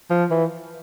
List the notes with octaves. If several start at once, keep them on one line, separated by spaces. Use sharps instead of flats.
F3
E3